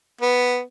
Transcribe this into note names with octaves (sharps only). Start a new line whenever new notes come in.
B3